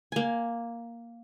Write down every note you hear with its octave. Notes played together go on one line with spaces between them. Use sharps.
A#3 G#5